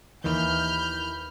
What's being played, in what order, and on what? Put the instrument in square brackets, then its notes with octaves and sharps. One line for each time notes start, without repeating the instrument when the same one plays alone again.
[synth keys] D#2 D#3 E3 [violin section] B5 F6 G6